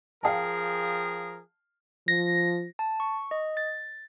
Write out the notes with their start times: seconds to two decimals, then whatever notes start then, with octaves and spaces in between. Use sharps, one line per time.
0.23 F3 G#4 A#4 F5 G5 A5
2.08 F3 A#6
2.79 A5
3.00 C#6
3.31 D#5
3.57 A6